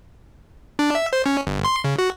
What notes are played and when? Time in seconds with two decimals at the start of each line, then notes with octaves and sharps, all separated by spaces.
0.79 D4
0.95 E5
1.13 C5
1.26 C#4
1.47 G1
1.65 C6
1.84 C#3
1.98 F#4